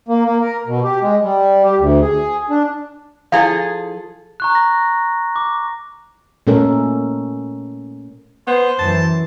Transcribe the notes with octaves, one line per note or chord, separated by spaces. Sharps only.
A#3
A#3
A#4
B2
G4
G#3
G3
G4
D2
G#4
D4
F3 E4 G#4 A4 F5
A#5 C#6 F#6
A#6
D6
A#2 A3 C#4 A4 A#4
B3 C5
F#2 E3 A5